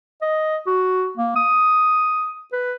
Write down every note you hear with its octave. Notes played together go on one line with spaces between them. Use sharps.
D#5
F#4
A#3
D#6
B4